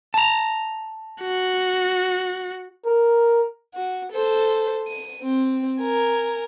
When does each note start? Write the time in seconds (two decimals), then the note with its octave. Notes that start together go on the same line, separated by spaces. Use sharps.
0.14 A5 A#5
1.21 F#4
2.86 A#4
3.74 F#4
4.12 A4 C5
4.88 D#7
5.22 C4
5.81 A#4 G#5